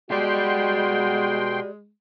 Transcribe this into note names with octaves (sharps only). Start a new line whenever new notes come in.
B2 G#3 F#4 G4 D5 G5 C6